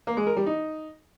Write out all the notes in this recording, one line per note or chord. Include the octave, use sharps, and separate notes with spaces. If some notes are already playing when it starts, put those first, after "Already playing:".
A#3
G#3
A#4
G3
D#4